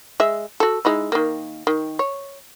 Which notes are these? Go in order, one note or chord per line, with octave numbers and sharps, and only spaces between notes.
G#3 E5
F#4 A4
G#3 D#4 E4
D#3 A#3
D#3
C#5